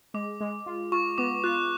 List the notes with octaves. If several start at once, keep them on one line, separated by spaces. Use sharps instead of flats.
G#3 D6
G#3
F4
F4 C#6
B3 D6
F4 F#6